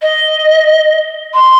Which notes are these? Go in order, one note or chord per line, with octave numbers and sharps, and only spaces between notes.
D#5
C6